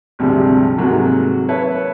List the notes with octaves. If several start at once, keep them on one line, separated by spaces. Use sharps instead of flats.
G#1 D2 C3 F3 G3
G#2 C3 F#3 A3 A#3
B4 C#5 E5 A5